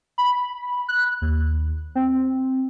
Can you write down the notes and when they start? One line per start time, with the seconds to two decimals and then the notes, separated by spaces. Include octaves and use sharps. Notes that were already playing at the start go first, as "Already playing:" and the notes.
0.18 B5
0.89 F#6
1.22 D#2
1.95 C4